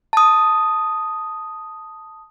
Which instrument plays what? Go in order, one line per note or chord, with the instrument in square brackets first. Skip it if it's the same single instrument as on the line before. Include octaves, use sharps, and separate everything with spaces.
[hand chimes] A5 D#6